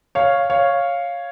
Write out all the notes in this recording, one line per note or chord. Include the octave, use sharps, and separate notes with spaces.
C#5 F5
C#5 F5